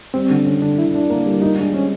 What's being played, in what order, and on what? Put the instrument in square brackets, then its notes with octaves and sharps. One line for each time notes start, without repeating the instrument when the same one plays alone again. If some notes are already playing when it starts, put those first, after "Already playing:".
[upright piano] G3 [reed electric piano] C4
[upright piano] D3
[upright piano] D3 [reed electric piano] C#4
[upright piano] D3 [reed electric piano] D4
[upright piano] D3 [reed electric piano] E4
[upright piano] D4
A#3
G3
[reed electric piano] D#4 [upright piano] F4
[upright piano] G#3 [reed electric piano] D4
[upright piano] C4 [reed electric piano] C#4